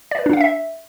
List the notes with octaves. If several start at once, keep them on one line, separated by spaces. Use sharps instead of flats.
D5
B4
D4
F5
E5